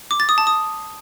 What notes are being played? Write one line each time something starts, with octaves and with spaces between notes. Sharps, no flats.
D6
A6
D#6
A5
D#6